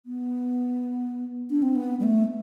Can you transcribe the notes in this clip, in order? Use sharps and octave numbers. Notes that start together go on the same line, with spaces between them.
B3
D4
C4
B3
G3
A3